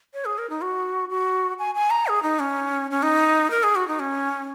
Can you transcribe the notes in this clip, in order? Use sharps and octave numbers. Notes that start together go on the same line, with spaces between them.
C#5
G#4
A#4
D#4
F#4
F#4
G#5
G#5
A#5
G#4
D#4
C#4
C#4
D#4
A#4
G#4
F#4
D#4
C#4